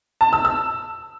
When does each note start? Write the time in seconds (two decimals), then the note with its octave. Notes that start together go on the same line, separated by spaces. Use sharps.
0.21 A5
0.33 E6
0.45 E6